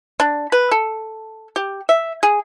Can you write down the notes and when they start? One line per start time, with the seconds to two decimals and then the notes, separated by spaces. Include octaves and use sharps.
0.20 D4
0.52 B4
0.71 A4
1.56 G4
1.89 E5
2.23 G#4